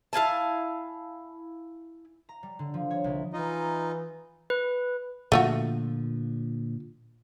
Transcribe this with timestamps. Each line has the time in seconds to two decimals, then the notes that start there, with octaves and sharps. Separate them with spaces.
0.13 E4 F5 G#5 A5
2.29 A#5
2.43 G3
2.59 D3
2.74 F3
2.91 C#5
3.04 C2
3.33 E3 D#4 F4 D#5 A#5
4.50 B4
5.32 A#2 D3 F3 A3 F4 F#4